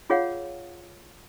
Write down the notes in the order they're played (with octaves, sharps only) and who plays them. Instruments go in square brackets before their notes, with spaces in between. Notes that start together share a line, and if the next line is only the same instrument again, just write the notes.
[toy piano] F4 G#4 C#5 F5 F#5